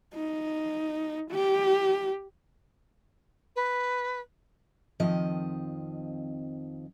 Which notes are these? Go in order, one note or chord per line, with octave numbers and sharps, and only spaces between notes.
D#4
G4
B4
F2 D#3 F3 C4 D#5